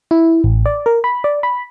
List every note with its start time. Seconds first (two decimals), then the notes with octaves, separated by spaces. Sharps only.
0.11 E4
0.44 A1
0.66 D5
0.86 A#4
1.04 B5
1.24 D5
1.43 B5